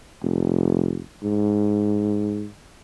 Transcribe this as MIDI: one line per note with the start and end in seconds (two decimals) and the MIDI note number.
0.23 1.04 29
1.23 2.48 44